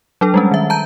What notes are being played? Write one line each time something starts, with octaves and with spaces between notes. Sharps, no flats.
F#3 D4 A4
G3 G#3 C#4
D#3 E5
A5 A#5 G6